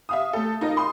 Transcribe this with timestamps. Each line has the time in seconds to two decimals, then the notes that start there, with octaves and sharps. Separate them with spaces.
0.09 E5 F5 D#6
0.33 A3 A4
0.61 D#4 F4 A#4 D#5
0.77 C6 D#6